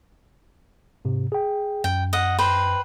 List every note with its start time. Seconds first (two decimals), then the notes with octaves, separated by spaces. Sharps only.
1.05 G#2 C3
1.32 G#4 G5
1.84 F#2 G5
2.13 D#5 F#5
2.39 B4 C5 G5